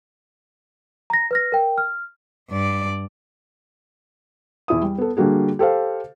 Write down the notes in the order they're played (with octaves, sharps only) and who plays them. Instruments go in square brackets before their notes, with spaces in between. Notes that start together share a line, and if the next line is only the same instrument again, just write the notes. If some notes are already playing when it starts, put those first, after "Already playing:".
[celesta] A#5 A#6
B4 F6 A#6
A#4 G5
F6
[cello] G2 D5
[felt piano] E2 E4 D#6
G3
B3 A4
D3 G3 A#3 F#4 G#4
G4 A4 C5 F5